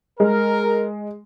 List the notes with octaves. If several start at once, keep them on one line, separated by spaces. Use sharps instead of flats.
G#3 A#4